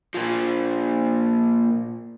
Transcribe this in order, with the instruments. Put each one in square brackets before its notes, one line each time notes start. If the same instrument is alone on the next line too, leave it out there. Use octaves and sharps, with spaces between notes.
[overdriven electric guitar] A#2 F3